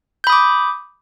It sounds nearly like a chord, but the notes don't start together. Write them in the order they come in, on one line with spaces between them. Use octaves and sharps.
G6 B5 D#6 D6